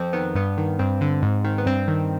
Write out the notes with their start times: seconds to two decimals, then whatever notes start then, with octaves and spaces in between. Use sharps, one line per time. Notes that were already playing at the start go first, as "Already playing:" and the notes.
Already playing: F2 C4
0.13 D#3 B3
0.35 G2 B3
0.58 D#3
0.79 G2 C4
1.01 D3
1.22 G#2
1.44 D#3
1.58 B3
1.66 G2 C4
1.88 D#3